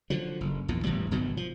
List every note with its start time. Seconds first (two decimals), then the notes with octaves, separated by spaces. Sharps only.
0.10 D3 F3 F#3
0.41 F#1
0.68 A#1 E2 A#2
0.84 E1 A2 E3 G3
1.11 G1 B2 D#3 F#3
1.37 F3